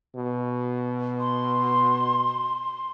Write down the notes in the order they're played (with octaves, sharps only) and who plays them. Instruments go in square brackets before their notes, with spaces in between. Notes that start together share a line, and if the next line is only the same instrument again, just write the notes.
[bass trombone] B2
[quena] C6